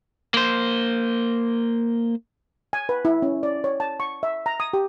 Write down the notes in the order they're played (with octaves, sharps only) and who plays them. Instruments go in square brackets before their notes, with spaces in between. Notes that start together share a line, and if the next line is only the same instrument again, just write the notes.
[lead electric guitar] A#3 C5
[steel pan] G#5
B4
E4
C#4
D5
C#5
A5
C#6
E5
A#5
D#6
G4